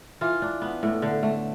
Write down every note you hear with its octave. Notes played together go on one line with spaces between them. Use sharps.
E3 F4
D4
B3
A2
D3
A3